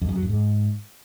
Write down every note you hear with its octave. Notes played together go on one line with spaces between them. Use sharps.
F2
F#2
F#3
F#2
G#2